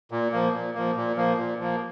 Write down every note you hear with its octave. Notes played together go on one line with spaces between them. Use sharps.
A#2
F3 A#3
A#2
F3 A#3
A#2
F3 A#3
A#2
F3 A#3